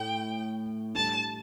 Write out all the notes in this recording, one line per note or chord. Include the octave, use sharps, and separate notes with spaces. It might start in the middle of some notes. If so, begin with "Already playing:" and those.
Already playing: A2 G5
A2 G3 D4 A4 A5